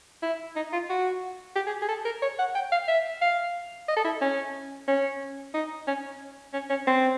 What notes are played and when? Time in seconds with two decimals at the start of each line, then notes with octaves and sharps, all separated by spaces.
0.23 E4
0.56 D#4
0.73 F4
0.90 F#4
1.56 G4
1.67 G#4
1.82 G#4
1.89 A4
2.05 A#4
2.22 C#5
2.39 F#5
2.55 G5
2.72 F5
2.88 E5
3.22 F5
3.88 D#5
3.96 A4
4.05 E4
4.21 C#4
4.88 C#4
5.54 D#4
5.88 C#4
6.54 C#4
6.70 C#4
6.87 C4